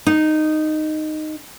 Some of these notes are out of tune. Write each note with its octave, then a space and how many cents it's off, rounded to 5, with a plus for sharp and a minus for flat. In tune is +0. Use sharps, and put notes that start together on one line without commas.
D#4 -10